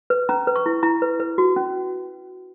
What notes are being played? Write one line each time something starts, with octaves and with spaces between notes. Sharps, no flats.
B4
C#4 A#5
B4
C#6
E4
E4 A#5
B4
B4
F#4
C#4